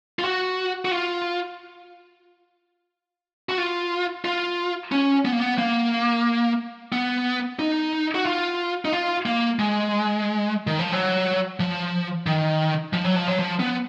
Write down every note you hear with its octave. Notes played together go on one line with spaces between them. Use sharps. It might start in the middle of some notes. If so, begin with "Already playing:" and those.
F4
F#4
F#4
F4
F#4
F4
F4
C#4
B3
A#3
B3
A#3
B3
D#4
F#4
F4
D#4
F4
A#3
G#3
D#3
F3
F#3
F3
D#3
F3
F#3
F3
F#3
F3
B3